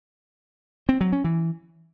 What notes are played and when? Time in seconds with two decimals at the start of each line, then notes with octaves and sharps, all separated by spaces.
0.89 C4
1.01 F#3
1.12 C#4
1.24 E3